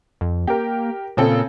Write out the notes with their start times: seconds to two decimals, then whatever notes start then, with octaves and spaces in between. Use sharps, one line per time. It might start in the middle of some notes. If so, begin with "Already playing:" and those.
0.21 F2
0.47 A#3 G4 A#4
1.17 A#2 C#3 C4 A4